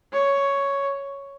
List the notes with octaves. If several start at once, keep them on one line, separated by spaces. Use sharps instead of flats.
C#5